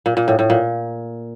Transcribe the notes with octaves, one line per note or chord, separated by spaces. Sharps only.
A#2
A#2
A2
A2
A#2